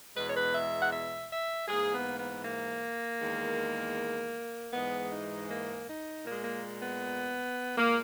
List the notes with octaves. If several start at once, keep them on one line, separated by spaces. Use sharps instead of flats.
E2 B2 G#3 B4
C#5
B4
E5
F#5
E5
E5
G#2 E3 A#3 G#4
B3
B3
A#3
E2 D#3 G#3
G#2 E3 G#3 B3
D#4
A#3
D#4
A#2 G#3 A#3
A#3
B3
A#2 G#3 A#3